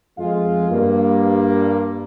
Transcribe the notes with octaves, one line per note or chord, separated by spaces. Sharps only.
F2 G#3 F4 F5
G2 A#3